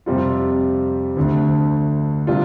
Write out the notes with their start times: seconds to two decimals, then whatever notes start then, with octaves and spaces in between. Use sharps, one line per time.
0.06 F2 C3 G3 C4 F4
1.17 D2 D3 A3
2.27 C3 G3 D4 F4